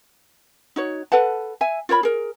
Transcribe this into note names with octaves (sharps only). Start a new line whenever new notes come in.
D#4 F#4 C#5
A4 B4 F#5 A5
E5 G#5
F4 A#4 C#5 B5
G#4 A#4